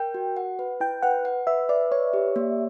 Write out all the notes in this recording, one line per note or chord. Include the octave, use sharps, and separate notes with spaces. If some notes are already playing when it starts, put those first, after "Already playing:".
Already playing: A#4 G5
F#4
F#5
B4
E4 G5
B4 F#5
F#5
B4 E5
B4 D5
B4 C#5
G4
A#3